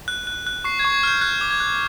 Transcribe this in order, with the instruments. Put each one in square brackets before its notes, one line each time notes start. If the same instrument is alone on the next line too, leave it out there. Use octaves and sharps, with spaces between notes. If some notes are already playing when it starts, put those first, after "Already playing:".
[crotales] F#6
F#6
F#6
C#6 C7
G#6
C#6
G#6
F6 G6
F#6 G#6
D6
G#6
F#6